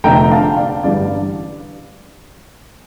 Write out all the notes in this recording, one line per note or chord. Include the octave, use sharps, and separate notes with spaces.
F1 F2 D3 A3 G5 A#5
F5 A5
D5 F5
A1 G2 D3 G3 D5 F5